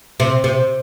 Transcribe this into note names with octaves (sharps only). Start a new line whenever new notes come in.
C3
C3